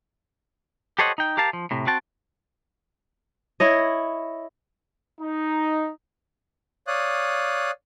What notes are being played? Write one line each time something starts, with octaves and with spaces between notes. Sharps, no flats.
G4 A4 C5 C#5 D#5 F#5
D#4 G5
G4 A#4 F5 A5
F3
A2 C3
C4 F#4 G5 A5
E4 C#5 D#5
D#4
C#5 D5 F5 D#6 F#6